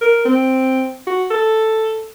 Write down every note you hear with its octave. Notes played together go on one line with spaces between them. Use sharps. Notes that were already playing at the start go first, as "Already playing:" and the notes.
A#4
C4
F#4
A4